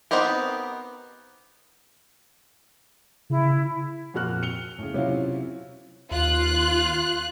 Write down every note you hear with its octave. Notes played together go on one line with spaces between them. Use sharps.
B3 C4 D#4 G4 A#4
C#3 E4
F2 A#2 F#4 F6 F#6
C#7 F7 G7
A2 C#3
C3 F#3 C#4 E4 F4
D#2 F4 F#6